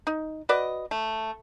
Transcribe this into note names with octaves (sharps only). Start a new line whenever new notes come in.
D#4
F#4 B4 D5 D#5
A3